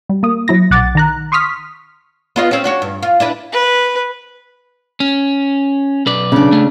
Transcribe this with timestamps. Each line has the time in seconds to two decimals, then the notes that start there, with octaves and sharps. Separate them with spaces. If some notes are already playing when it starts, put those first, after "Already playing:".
0.09 G3
0.23 A#3 D#6
0.48 F#3 E4 A#6
0.71 B1 F#5 D6 A6
0.95 D#3 A#5 F#6
1.32 C6 C#6 D#6 F6 B6
2.36 B3 F4 D#5
2.51 C4 C#4
2.64 D4 F#4 C#5
2.82 G2
3.03 F4
3.20 D4 E4 B4
3.52 B4
5.00 C#4
6.06 B1 B4 D5
6.32 C#3 D4
6.52 A3 C#4